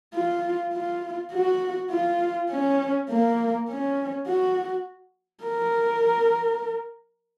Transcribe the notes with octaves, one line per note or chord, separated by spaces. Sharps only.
F4
F4
F#4
F4
C#4
A#3
C#4
F#4
A#4